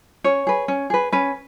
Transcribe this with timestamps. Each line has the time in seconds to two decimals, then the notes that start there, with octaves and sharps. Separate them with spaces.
0.24 C#4 C#5
0.47 G#4 B4
0.68 C#4
0.90 G#4 B4
1.12 C#4 B4